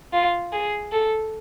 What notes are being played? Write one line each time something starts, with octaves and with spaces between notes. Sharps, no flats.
F4
G#4
A4